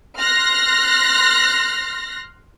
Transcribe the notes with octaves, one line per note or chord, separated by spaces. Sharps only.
C6 F6 F#6 A#6